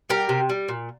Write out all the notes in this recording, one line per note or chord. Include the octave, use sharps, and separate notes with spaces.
G3 G4 A#4
C3
G3
A#2